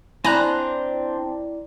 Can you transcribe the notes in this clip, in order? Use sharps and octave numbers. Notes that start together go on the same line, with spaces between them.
C4 D4 E4 D5 G#5 A#5 B5 F#6